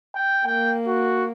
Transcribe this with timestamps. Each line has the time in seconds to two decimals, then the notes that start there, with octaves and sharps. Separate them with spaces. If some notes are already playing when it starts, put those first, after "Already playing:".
0.15 G5
0.46 A#3 G5
0.87 F#4